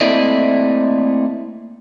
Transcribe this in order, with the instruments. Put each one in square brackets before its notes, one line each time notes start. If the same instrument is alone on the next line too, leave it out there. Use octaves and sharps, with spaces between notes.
[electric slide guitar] A3 A#3 C4 E4 D5 D#5